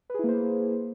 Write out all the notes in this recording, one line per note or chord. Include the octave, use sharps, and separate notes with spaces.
A#3 E4 G#4 B4 C5